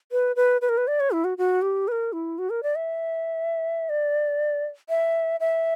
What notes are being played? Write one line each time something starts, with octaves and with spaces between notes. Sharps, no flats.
B4
B4
B4
A#4
B4
D5
C#5
E4
F#4
F#4
G4
B4
A#4
E4
F#4
A#4
D5
E5
D5
E5
E5